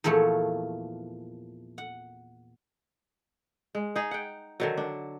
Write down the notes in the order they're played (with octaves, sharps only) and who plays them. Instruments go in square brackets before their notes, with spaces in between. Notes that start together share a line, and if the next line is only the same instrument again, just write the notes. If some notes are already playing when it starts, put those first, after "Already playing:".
[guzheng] E2 A#2 F3 A3 C#5
F#5
[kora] G#3
D#4 G#4
F#5 G5
D3 D#3 F#3
D4